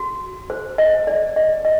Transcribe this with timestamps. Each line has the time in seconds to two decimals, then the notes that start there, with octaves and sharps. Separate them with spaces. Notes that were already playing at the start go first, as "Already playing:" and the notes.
Already playing: F#4
0.50 C5
0.78 D#5
1.07 D5
1.36 D#5
1.65 D#5